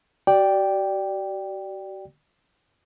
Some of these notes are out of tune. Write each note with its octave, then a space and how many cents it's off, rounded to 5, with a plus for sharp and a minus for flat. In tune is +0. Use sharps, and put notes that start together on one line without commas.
F#4 +45 D5 +0 G5 +0